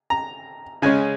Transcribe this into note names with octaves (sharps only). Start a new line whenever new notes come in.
A#5
C#3 G#3 C#4 G#5